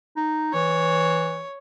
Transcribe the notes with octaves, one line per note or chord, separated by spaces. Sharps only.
D#4
E3 C#5